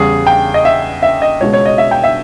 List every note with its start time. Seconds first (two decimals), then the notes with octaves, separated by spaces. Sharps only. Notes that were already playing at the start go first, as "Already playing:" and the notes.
Already playing: E2 C#3 G3 G#4
0.27 G5
0.54 D#5
0.65 E5
1.03 E5
1.22 D#5
1.41 C#2 B2 G#3 C#5
1.53 C#5
1.66 D#5
1.78 E5
1.91 G5
2.04 E5